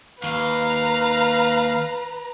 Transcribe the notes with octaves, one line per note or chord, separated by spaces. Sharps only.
D#2 B4 F5 A#5